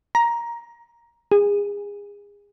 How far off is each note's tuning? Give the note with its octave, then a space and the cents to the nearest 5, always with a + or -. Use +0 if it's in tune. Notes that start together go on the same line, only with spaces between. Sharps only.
A#5 +10
G#4 -30